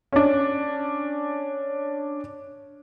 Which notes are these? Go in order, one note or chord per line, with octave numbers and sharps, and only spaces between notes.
C#4 D4